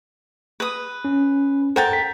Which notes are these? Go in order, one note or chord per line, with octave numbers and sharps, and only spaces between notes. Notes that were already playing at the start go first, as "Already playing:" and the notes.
B4 D#6
C#4
A4 A#4 C5 F#5 G5 A5
B6